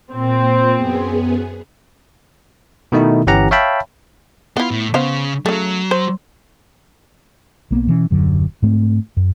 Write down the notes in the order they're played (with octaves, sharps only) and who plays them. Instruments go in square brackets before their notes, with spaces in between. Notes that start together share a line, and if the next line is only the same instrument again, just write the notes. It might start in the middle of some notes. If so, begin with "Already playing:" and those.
[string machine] A#2 [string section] C4
[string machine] F#2 B3 G#4
[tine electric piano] B2 D#3 A3 D#4 E4
G1 E3 C#4 G4 F#5 A#5
C#5 E5 F5 G5 A5 B5
[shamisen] B3 E4 [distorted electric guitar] F4
[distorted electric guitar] A2
[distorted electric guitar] C#3 [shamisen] B3 C5 F5
[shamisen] C#3 A3 [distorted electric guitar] F#3
[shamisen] C5
[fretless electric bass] B1 A#3 B3
B2 E3 G#3 C#4
D#1 F#2 D3 F#3
G#2 A3 C4
F#2